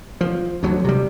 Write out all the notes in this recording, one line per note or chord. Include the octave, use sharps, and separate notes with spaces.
F3
D2 F#3
C3 G3